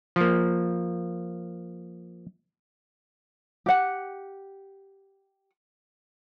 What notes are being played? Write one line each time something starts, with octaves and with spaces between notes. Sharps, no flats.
F3 A#3
G4 F#5